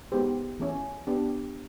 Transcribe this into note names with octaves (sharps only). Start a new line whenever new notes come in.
G#3 B3 D#4 G4 C5
E3 A3 C#4
B3 D4 G4